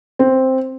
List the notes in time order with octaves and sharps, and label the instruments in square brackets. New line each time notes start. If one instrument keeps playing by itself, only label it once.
[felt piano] C4